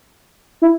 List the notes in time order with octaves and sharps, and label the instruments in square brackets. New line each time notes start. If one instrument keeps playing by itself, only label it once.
[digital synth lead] E4